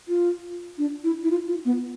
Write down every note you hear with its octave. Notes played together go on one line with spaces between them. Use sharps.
F4
D4
E4
E4
F4
F4
B3